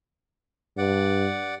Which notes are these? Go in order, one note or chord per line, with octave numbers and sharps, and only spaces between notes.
G2 D5 F#5